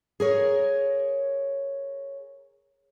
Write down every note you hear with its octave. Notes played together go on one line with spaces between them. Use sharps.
G#4 A#4 C#5